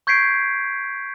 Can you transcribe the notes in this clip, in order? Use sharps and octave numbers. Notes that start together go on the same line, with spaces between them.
C#6 G6 G#6 B6 C7 D7